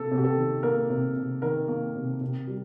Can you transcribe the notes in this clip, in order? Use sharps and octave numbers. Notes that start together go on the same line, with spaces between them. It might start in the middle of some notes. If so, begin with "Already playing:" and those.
Already playing: C3 A#3 A4
C3
G4
A4
D#3
A#3 A#4
C3
C3
D#3 A#4
A#3
C3
C3
G3